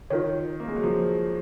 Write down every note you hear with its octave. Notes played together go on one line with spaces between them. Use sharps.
D#3 F4 A#4 C#5
A#3
G#3
F#3
F3